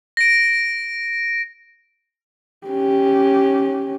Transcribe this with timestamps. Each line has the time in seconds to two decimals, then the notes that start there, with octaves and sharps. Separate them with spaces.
0.17 A#6 D7
2.68 C#4 G4